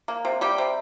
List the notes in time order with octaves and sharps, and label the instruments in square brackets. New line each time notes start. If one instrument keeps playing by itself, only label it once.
[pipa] A#3
C3
G3 G4
C3